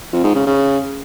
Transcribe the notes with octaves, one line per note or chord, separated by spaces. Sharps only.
F2
G#2
C#3
C#3